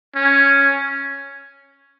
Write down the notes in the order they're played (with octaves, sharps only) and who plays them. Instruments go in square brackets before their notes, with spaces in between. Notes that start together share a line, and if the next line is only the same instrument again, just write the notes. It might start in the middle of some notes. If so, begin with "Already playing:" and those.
[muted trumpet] C#4